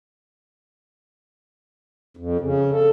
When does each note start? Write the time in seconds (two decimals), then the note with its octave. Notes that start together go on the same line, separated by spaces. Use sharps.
2.17 F2
2.40 C#3
2.71 A4